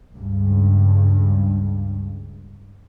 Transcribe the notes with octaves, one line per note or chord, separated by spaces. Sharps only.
C#2 G2